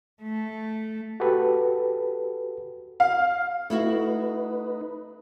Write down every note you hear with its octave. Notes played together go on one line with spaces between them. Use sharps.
A3
F#4 G4 A4 B4
F5
A3 D#4 E4 F#4 B4